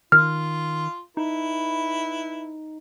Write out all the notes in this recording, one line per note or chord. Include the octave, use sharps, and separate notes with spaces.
D#3 F4 F6
D#4 E4 B4